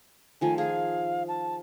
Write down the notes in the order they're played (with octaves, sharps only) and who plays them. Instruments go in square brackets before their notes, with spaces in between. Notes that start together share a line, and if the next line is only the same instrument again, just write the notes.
[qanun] D#3 F3 A3 [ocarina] G#5
[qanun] G#4 [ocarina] F5
[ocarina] A5